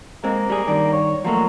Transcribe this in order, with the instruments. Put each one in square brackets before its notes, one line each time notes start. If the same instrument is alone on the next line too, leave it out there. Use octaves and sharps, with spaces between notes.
[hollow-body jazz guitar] G#3 C4 [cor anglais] A#3
[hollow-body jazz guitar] G3 G#4
G2 D#3 D5
[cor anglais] C#5
[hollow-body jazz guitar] F3 A3 A#3 [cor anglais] F#3